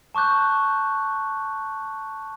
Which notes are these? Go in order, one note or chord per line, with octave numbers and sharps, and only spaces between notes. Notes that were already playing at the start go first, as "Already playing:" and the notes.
A5 C#6 D6 F#6 G6